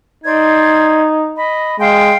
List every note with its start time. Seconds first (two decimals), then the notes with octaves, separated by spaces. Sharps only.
0.24 D#4 C5 D5 G#6
1.36 D#5 B5
1.79 G#3 F5 G5 C6